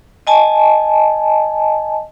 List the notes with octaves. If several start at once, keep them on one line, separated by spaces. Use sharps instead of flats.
D#5 G#5 A5